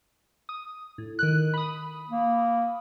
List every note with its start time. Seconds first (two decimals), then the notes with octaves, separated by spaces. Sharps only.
0.49 D#6
0.98 A2
1.19 D#3 F#6
1.54 B5 D#6
2.09 A#3